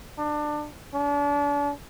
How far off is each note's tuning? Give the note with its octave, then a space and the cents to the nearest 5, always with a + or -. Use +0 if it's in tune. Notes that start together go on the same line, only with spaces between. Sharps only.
D4 +25
D4 -35